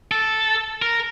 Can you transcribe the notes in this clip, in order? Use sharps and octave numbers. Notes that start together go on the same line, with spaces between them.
A4
A#4